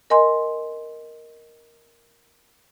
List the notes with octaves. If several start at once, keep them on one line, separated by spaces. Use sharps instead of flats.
A#4 D#5 G#5 C6